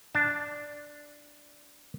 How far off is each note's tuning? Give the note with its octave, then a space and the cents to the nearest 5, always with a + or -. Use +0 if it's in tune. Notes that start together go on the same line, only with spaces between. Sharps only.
D4 +0 A5 +0